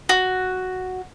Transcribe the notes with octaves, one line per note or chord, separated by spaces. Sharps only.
F#4